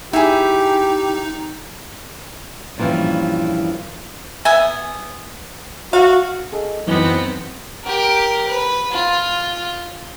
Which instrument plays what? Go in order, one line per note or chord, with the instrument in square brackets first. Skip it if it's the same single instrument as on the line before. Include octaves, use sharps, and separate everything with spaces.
[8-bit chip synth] D#4 [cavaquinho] E4 G#4 [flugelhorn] G4
[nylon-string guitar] G2 A#2 E3 F3 C#4
[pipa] B3 E5 G#5
[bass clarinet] F#4 [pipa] F5
[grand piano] G#4 A4 D#5
[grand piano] F#2 E3 D#4 [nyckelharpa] B3 C4
[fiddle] G4 A#4
B4
F4